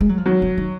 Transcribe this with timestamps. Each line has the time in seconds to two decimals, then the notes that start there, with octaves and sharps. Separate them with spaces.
0.01 G#3
0.09 F#3
0.18 F3
0.26 D#3 F#3
0.42 D3
0.58 D#3